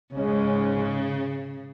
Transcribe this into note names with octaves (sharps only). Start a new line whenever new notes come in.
G#2 C#3 G#3 C#4